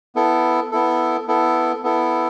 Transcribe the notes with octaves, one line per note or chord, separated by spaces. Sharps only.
B3 E4 A4
B3 E4 A4
B3 E4 A4
B3 E4 A4